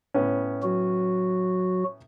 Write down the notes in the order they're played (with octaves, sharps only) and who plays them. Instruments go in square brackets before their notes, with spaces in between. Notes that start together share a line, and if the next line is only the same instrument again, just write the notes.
[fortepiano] A2 B3 C#4
[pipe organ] F#3 F#4